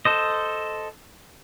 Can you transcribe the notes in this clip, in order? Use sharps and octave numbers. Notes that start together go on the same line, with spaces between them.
A4 C5 D#5